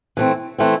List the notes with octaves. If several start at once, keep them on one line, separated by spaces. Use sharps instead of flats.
E3 A3 C4
E3 A3 C4